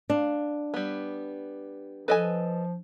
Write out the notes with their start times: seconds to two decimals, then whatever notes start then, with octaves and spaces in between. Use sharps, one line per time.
0.10 D4 F5
0.74 G3 B3
2.08 F3 A4 B4 D#5 G#5